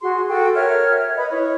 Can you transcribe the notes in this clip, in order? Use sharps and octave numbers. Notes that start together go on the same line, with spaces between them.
F#4 G#4 C6
F#4 A4 G5
A#4 C#5 E5 F6
B4 D#5 B5
E4 C#5